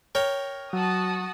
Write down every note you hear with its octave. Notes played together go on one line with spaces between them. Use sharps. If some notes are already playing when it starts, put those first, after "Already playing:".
A#4 C#5 G5
F#3 F#4 A5 D#6